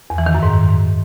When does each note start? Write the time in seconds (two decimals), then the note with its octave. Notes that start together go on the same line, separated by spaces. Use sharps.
0.10 E2
0.18 E3
0.26 D#3
0.35 F#2
0.43 G#2